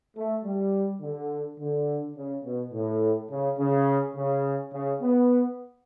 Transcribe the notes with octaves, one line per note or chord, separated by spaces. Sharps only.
A3
G3
D3
D3
C#3
B2
A2
C#3
C#3
C#3
C#3
B3